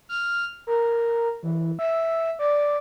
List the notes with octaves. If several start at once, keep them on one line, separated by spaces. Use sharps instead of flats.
F6
A#4
E3
E5
D5